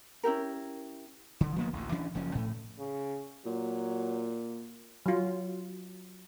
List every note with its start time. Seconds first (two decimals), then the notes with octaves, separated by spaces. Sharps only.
0.24 C#4 E4 G4 A#4
1.41 D3
1.56 F3 A#3 B3
1.73 A1 D2
1.92 E3 C#4 D4
2.15 F#1 F3 C#4
2.35 A2 A3
2.79 C#3
3.46 A#2 F#3
5.06 F#3 F4